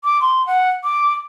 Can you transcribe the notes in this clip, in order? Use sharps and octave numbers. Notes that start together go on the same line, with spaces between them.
D6
C6
F#5
D6